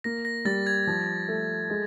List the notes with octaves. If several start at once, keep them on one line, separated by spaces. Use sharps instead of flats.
A#3 A#6
A#6
G3 A6
G#6
F3
A3
G#3